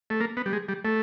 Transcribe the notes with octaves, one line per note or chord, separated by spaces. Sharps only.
A3
A#3
B3
G3
G#3
G3
A3